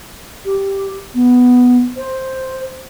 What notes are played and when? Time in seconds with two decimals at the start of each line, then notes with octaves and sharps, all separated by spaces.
0.45 G4
1.15 B3
1.97 C5